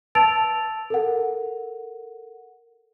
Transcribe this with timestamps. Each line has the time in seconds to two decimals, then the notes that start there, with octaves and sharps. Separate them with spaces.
0.15 B4 A5 E6 A6 D7 F7
0.90 A4 A#4 F#5